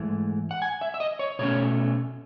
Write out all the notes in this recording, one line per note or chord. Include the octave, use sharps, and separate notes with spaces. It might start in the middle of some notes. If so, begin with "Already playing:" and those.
Already playing: G#2 E3 A3
F#5
G#5
E5
E5
D#5
C#5
B2 A3 C#4 C#5